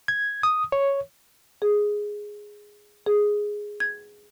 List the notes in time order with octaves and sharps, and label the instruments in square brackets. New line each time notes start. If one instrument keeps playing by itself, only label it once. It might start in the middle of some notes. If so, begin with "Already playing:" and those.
[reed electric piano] G#6
D#6
C#5
[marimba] G#4
G#4
G#6